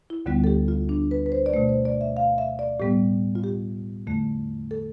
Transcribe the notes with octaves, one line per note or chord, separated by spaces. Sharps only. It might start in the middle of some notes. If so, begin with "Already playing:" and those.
E4
D2 D3 G3 B3 F4
A4
G4
F4
D4
B4
B4
C5
D5
B2 A3 C5
C5
D5
E5
F5
E5
D5
A2 G3 B3 G4
F4
G4
E2 D3 A3
A4